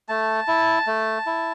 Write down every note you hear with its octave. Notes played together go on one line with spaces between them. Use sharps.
A3 A5
E4
A3
E4